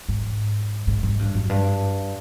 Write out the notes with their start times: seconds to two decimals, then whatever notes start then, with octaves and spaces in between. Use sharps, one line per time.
0.09 G#2
0.87 G#2
1.03 G#2
1.19 G2
1.35 F#2
1.50 G2